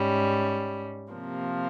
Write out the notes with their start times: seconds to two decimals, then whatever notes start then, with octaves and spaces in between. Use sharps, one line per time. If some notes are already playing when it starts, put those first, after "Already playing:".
Already playing: G#2 G3 C#4
1.11 C3 F3 A#3